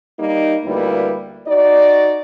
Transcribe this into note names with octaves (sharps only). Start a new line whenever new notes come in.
G3 A#3 D#4
D2 G3 A#3 E4 B4
D#4 F#4 D5